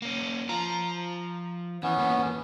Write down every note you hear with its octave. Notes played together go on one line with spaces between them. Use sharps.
A#3 C#4
F3 F4 A#5
E3 B3 C#4
E2 A#3 B4